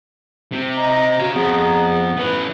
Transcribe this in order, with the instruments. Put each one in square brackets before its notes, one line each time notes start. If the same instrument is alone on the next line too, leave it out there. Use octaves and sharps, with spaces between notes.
[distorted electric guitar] C3 C4
[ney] D#5 [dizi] A#5
[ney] F#4 [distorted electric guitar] C#5 F5
[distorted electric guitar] F2 [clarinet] B3 [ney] G#4
[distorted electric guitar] E3 C#4 [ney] B4